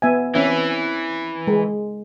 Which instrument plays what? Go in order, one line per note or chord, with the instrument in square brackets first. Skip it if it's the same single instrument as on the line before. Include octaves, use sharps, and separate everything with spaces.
[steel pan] B3 E5 G#5
[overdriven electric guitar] E3 [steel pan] C4 C#4 E5
[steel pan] G#3